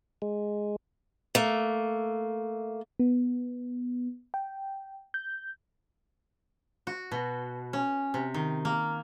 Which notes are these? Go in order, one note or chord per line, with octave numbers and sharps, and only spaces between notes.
G#3
A3 A#3
B3
G5
G6
F#4
B2
C#4
C3
D#3
A#3